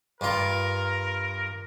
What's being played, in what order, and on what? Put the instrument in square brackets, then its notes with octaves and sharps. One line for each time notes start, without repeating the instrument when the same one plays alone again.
[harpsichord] G2 F4 [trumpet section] A#4